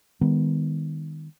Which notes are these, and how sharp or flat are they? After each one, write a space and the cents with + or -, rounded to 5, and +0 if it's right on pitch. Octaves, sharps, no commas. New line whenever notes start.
D#3 +0 G#3 -40 B3 +0